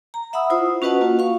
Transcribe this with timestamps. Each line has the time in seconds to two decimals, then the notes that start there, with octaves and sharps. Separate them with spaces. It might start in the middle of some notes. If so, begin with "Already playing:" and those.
0.14 A#5
0.33 E5 F#5 B5 D#6 E6
0.50 E4 F4 C5 D#6
0.82 C#4 F#4 B4 D#5 F#5 A5
1.01 A#3 F4 F#4
1.19 F5 C#6